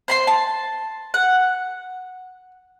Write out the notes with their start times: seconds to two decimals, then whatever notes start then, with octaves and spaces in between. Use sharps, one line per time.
0.08 C5 B5 C6
0.27 A5
1.14 F#5